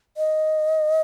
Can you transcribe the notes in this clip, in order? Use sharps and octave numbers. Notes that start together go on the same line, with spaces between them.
D#5